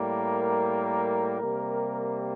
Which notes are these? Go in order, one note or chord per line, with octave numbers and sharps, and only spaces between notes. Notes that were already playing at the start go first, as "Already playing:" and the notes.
Already playing: A2 G3 A#3
A#4
C3 G3 A#3